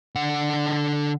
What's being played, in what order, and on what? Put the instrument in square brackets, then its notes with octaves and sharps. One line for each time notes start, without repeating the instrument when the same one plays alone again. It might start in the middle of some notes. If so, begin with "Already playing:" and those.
[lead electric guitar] D3 F#5